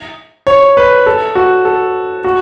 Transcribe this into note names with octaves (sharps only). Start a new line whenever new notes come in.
C#5
B4
A4
F#4
A4
F#4